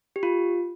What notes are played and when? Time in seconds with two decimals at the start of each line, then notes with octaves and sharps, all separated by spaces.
0.16 G4
0.23 F4